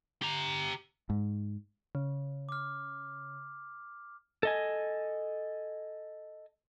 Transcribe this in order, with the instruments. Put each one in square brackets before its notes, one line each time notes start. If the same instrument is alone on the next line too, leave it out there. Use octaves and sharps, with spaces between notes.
[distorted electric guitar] G4 A#5
[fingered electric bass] G#2
[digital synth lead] C#3
[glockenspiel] D6 F6
[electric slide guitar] A4 D#5 G#5